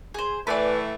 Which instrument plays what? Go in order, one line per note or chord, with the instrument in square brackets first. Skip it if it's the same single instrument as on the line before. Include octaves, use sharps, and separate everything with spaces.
[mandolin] G#4 C5
[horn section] A2 E3 A3 [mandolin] B4 D5 G#5